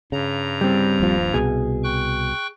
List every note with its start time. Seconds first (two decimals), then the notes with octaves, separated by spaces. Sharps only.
0.12 G2 C#3 A#5
0.61 G3 C4
1.00 D#1 A#1 F3
1.34 C2 B2 G#4
1.84 G5 C#6 F#6